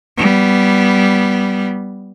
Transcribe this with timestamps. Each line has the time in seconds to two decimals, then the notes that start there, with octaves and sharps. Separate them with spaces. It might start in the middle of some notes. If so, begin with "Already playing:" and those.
0.17 G3 B3